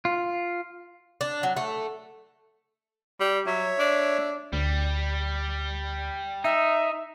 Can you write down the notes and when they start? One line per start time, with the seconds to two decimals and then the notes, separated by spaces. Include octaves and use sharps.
0.05 F4
1.21 D4
1.43 F#3
1.57 A3
3.20 G3
3.46 F#3 C#5 E5
3.79 D4
4.53 D2 G3
6.44 D#4 E5